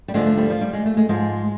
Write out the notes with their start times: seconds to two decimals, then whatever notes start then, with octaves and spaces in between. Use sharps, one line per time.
0.08 G3
0.14 D2 D3 F3 G#3
0.26 A3
0.37 G3
0.50 F3
0.61 G3
0.73 G#3
0.85 A3
0.97 G#3
1.09 G#2 F3 G#3